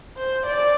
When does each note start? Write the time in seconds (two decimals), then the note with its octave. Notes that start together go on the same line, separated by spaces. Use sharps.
0.17 C5
0.46 D5